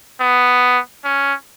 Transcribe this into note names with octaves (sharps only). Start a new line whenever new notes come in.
B3
C#4